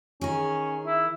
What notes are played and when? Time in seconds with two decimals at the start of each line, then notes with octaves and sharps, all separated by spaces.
0.21 D#3 C#4 G#4
0.86 E4